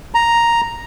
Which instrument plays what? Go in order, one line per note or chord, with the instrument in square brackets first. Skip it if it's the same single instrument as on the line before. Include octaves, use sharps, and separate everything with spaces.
[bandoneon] A#5